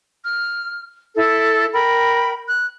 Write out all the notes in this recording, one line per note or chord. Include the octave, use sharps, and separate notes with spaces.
F6
E4 A4
A#4 G5 B5
F#6